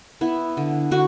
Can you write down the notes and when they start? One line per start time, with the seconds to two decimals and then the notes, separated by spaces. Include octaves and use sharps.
0.21 B3 E4
0.57 D3
0.91 D3 F#4